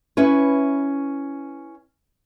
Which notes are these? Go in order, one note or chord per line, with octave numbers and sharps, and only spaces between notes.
C#4 E4 B4 C#5